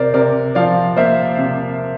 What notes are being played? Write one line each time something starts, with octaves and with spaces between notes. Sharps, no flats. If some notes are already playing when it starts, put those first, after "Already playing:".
Already playing: C3 A#4 C5 D5
C3 A#4 D5
F3 D5 F5
A#3 C5 E5
C3